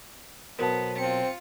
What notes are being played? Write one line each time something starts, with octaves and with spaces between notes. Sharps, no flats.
B2 F#3 B3 A#4 C5 A5
C4 F4 C#7